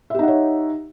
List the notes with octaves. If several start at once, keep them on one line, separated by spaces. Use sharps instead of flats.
D#4 G4 C#5 E5 F#5